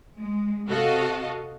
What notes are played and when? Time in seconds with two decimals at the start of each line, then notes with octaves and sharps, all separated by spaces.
0.20 G#3
0.70 C3 F#4 A4 D#5 F5